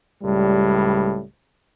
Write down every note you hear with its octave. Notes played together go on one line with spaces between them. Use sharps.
C#2 A2 G3